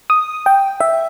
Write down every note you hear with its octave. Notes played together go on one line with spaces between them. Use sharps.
D#6
G5
E5